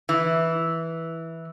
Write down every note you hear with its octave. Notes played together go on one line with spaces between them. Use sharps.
E3